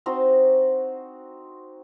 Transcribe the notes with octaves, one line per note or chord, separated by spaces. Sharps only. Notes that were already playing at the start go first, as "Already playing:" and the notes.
C4 D#4 F#4